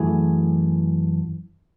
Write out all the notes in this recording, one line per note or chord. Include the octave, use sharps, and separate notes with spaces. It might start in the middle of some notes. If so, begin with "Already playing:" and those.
Already playing: F#2 E3 A3 G#4